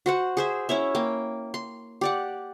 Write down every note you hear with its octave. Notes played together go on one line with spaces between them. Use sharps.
F#4 C5 F#5
G#4 C5 E5
C#4 E4 C#5 E5
A#3 G5
C6
G4 D5 F#5